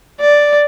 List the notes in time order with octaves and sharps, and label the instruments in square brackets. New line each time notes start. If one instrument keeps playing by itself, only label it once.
[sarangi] D5